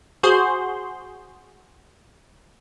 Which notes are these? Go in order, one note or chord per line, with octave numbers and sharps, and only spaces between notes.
F#4 G#4 C5 C6